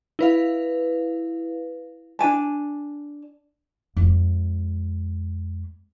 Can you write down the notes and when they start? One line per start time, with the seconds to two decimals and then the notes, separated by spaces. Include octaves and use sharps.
0.19 E4 B4 F5
2.19 D4 G4 G#5 A5
3.97 F2 G#3